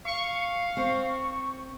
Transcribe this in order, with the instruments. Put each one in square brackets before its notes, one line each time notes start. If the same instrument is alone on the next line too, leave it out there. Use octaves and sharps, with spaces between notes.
[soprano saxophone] F5 [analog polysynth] C#6
[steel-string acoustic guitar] C4